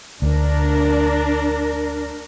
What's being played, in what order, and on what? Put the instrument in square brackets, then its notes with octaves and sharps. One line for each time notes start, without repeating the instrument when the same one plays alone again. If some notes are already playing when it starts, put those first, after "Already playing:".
[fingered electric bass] D2 [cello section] D4 A#4